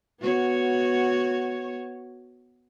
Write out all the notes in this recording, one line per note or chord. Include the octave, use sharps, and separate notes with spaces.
B3 F#4 C#5